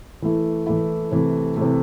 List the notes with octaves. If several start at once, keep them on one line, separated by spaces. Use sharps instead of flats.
E3 A3 E4
E3 A3 E4
C3 E3 A3
C3 E3 A3